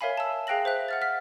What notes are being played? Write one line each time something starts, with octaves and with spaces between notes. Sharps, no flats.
A#4 C#5 E5 F5 G#5 B5
A5 E6
G#4 F5 G5 F#6 A#6 F#7
C5 E5 F#6
F#5 F6 A6
F6 B6